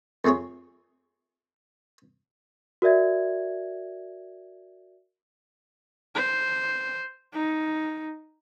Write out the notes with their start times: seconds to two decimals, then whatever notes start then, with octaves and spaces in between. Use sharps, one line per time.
0.24 F2 A3 C4 G#4 C#5
2.82 F#4 A#4 D5 E5 G#6
6.15 C5
7.33 D#4